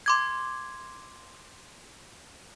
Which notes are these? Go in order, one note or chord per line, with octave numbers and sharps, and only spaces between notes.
C6 D6 G#6